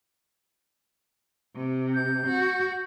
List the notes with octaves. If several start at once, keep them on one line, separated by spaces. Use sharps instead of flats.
C3
G6
F#4